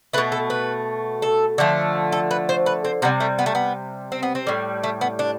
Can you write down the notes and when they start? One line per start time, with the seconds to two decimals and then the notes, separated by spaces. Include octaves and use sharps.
0.13 A3 B4
0.18 B2
0.32 A4
0.50 B4
1.22 A4
1.58 D3 F3 A3
2.12 A4
2.31 B4
2.49 C5
2.66 B4
2.85 C4
3.02 C3 G3 B3
3.20 A3
3.39 B3
3.46 A3
3.55 B3
4.12 C4
4.23 B3
4.35 C4
4.47 A2 G3
4.83 A3
5.01 B3
5.19 D4